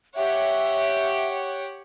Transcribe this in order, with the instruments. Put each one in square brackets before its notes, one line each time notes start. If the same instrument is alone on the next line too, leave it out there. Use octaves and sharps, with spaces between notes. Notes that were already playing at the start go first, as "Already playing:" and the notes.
[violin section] G4 C#5 F#5 [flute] E5